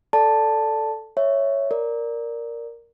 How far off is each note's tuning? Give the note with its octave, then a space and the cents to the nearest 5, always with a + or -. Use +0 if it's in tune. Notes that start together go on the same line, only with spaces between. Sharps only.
A4 +0 D5 +0 A5 +0
C#5 +0 E5 +0
A#4 +0 D5 +0